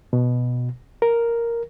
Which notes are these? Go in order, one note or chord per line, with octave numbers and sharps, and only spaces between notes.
B2
A#4